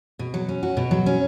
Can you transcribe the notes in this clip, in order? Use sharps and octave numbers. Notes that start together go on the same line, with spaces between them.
B2
F#3
C#4
F#4
B2
F#3
C#4